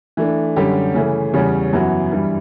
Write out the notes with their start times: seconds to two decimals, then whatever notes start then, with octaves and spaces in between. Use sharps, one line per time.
0.17 E3 A3 D4
0.56 F#2 D3 G3 C#4 G4
0.94 C#3 E3 A3
1.34 E2 C#3 G3 C#4
1.73 F#2 E3 B3 F#4
2.11 G2 E3 G3